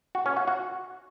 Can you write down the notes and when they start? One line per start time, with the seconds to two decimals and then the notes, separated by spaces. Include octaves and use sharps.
0.15 F#4
0.26 C#4
0.37 F#4
0.48 F#4